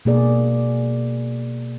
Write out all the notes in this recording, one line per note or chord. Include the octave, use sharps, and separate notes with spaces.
B2 A#3 G#4 D5